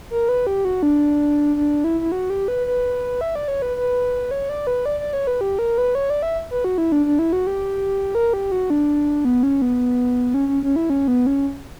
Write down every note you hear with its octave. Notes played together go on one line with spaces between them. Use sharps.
A#4
B4
G4
F#4
D4
D4
E4
E4
F#4
G4
B4
B4
E5
D5
C#5
B4
B4
C#5
D5
B4
D5
D5
C#5
B4
G4
A#4
B4
C#5
D5
E5
B4
F#4
E4
D4
D4
E4
F#4
G4
A#4
G4
F#4
D4
B3
C#4
B3
C#4
C#4
C#4
E4
C#4
B3
C#4